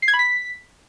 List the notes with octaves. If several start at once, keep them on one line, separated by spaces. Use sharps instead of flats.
C7
G#6
B5
B6